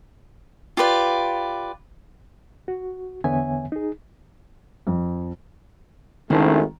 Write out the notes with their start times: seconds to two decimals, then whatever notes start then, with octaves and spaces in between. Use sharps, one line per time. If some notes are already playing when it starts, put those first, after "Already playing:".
0.77 F4 G4 B4 D5
2.68 F#4
3.24 E2 D3 B3 C#5 E5 G#5
3.72 D#4 G#4
4.87 F2
6.30 G#1 D#3 A3 C#4 E4 C5